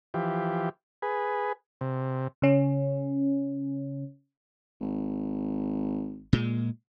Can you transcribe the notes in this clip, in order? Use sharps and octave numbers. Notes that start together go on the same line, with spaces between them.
E3 F3 G4
G#4 B4
C3
C#3 C#4
G#1
A#2 G#3